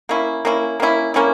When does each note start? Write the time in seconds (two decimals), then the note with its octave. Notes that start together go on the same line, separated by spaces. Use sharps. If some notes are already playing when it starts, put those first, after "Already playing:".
0.09 A#3 C#4 E4
0.45 A#3 C#4 E4
0.80 A#3 C#4 E4
1.14 A#3 C#4 E4